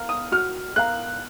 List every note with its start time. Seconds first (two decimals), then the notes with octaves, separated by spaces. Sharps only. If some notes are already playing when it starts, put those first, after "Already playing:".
Already playing: A#4 F5 A#5 F6
0.09 D#6
0.32 F#4 F6
0.76 A#4 F5 A#5 F#6